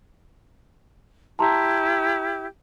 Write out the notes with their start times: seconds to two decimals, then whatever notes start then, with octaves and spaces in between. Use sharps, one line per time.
1.39 E4 G4 A5 A#5 C6